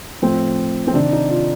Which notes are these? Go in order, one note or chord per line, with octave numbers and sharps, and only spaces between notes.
A2 F3 C4
C4
C3 D#3 D4
D#4
F4